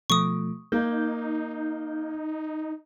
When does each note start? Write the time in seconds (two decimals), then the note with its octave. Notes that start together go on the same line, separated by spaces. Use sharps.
0.10 B2 F3 A3 C#6 D#6
0.72 A#3 D#4 G6